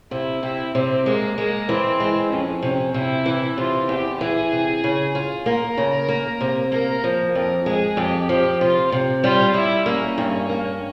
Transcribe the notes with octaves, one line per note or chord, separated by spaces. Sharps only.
C3 E4
C3 E4
C3 C4
G#3 A#3
G#3 A#3
E3 C4
G#3
F2 C#4
C3 C#4
C3 E4
E3
C3 F4
E2 G4
E3 G#4
C3
C#3
F4
A#3 A#4
C#3
A#3
C3
A#3 A#4
F3
F2 A#4
G#3 G#4
F2 G4
F3 G4
C3 F4
C3
G3 F4
G3 E4
A#3 C#4
G2
A#3